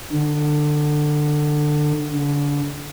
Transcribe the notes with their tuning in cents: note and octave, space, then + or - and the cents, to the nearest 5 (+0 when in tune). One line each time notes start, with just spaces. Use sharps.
D3 +20
D3 -30